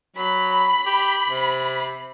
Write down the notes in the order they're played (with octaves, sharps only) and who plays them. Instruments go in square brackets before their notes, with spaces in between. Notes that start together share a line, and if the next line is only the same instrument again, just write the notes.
[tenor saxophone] F#3 [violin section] B5
[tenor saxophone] G4
C3